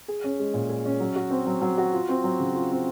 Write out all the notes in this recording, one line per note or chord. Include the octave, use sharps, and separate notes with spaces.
G#4
C#4
G#3
A#2
G#4
C#4
F#3
F#4
C4
F#3
F#3
F#4
F4
C4
F#3
C#3
F4
C4